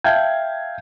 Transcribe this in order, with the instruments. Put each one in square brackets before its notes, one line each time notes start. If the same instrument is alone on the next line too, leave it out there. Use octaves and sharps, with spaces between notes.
[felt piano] E5 F5 G5 A5 G6 G#6